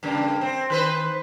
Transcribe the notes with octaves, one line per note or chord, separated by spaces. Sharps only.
G2 C#3 A#3
C4
D#3 B4 C5